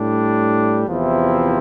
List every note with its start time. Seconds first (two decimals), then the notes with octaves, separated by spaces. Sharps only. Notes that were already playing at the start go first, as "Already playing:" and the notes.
Already playing: A2 G3 D4
0.87 E2 C3 F3 C4 E4